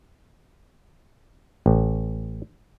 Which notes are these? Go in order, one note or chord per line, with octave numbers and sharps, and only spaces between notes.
A1